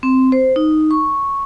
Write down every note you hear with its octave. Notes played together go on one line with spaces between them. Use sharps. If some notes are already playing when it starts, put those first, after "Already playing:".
C4
C5
D#4
C#6